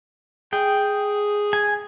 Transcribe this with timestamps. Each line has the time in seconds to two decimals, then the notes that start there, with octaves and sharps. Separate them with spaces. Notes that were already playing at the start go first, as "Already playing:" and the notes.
0.53 G#4 G5
1.53 G#5